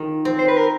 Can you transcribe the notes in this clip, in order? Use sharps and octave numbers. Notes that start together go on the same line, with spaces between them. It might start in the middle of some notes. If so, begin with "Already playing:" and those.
Already playing: D#3 F4
C4
C5
B4
A#4